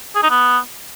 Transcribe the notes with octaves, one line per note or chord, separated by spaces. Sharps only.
G#4
D#4
B3